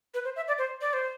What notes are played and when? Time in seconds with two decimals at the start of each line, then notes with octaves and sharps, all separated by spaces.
0.14 B4
0.25 C5
0.36 E5
0.48 D5
0.58 C5
0.81 D5
0.93 C5